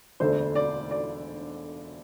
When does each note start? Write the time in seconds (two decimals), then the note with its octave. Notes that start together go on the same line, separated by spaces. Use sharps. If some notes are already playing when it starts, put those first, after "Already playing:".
0.20 E1 D2 D3 A3 C5
0.55 D5
0.91 D5